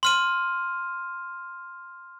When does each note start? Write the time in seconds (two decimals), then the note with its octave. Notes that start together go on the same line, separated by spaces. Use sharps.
0.03 C6 F6 D#7